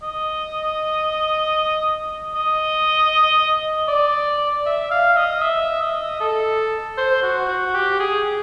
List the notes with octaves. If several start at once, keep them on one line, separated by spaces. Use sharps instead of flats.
D#5
D#5
D5
E5
F5
D#5
E5
D#5
A4
C5
F#4
F#4
G4
G#4